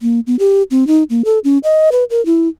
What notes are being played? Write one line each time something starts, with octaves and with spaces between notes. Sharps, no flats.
A#3
B3
G4
C4
D#4
A#3
A4
C#4
D#5
B4
A#4
E4